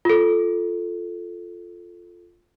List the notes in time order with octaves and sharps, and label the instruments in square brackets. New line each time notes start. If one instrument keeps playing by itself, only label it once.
[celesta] F4 A4